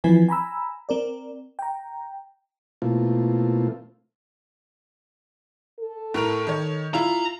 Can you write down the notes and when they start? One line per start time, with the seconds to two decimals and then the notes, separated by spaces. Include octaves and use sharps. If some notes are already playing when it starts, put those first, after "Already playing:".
0.04 E3 F3 C4 E4 B4 G#5
0.29 G#5 A#5 B5 E6
0.89 C4 A#4 D5
1.59 G5 A#5
2.82 B2 A3 A#3 C4 E4 F4
5.80 A4
6.14 A2 A#4 F7
6.47 D#3 C#5
6.94 E4 F4 A#5